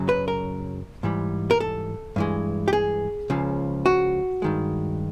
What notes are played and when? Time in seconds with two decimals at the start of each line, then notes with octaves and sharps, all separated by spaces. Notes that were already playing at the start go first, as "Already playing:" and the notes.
Already playing: F#2 C#3 F#3
0.09 B4
0.28 A#4
1.03 G#2 E3 G3
1.51 A#4
1.60 A4
2.16 G2 E3 G#3
2.68 G4
2.73 G#4
3.30 C#2 C#3 F3
3.86 F#4
4.42 G2 D#3 G#3